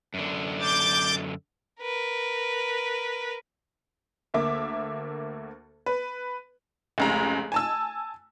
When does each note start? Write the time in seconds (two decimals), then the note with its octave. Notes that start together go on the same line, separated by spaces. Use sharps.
0.14 F#2 D3
0.60 D6 G6 A6
1.81 A#4 B4
4.34 D2 A#3 E5 D6
5.86 B4
6.98 F1 C#2 A#5
7.52 G#5 A5 E6